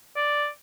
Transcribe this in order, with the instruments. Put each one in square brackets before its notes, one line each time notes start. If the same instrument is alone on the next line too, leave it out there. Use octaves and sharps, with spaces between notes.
[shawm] D5